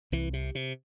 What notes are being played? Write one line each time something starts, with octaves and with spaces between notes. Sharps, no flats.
C2 E3
C3
C3